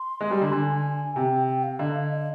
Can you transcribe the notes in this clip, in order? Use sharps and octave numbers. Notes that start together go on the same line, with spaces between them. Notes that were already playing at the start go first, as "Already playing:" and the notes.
Already playing: C6
G#3
G3
D3
D3 G#5
C3 G5
G5
F5
D3 D#5
F5
D#5